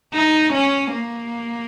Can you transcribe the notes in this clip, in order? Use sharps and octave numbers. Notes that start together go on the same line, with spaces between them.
D#4
C#4
A#3